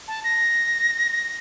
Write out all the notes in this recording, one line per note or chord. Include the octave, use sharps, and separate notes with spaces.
A5
A#6